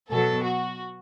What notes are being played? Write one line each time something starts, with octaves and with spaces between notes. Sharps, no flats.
B2 F#3 A4
F#4